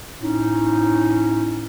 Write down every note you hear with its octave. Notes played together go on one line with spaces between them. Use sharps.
A2 C#4 D#4